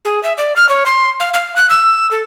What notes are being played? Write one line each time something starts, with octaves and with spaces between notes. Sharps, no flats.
G#4
E5
D5
F6
C#5
C6
F5
F5
F#6
E6
A4